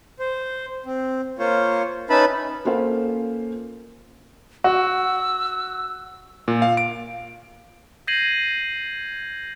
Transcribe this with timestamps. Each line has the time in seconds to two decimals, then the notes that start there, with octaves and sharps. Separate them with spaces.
0.19 C5
0.86 C4
1.39 A#3 F4 C5 C#5
2.10 C#4 D#4 B4 E5 A5 B5
2.65 A#3 C#4 F4 A4 C5 F5
4.64 F#4 E6
6.48 A#2
6.62 F5
6.77 D7
8.07 G6 G#6 A#6 C7 D#7 F#7